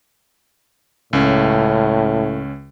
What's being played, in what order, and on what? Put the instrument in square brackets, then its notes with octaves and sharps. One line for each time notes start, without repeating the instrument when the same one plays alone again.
[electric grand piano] C#2 C#4 [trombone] A2